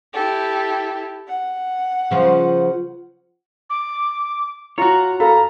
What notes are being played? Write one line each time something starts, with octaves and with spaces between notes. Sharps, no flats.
E4 G4 A4
F#5
C#3 F3 F4
D6
F4 F#4 C#5 A#5
A4 F5 A#5 B5